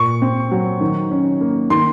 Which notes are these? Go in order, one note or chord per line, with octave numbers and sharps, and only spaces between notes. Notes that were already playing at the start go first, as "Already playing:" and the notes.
Already playing: A#2 C#6
C4
F#3
D#3
C#4
A#3
D#3 C6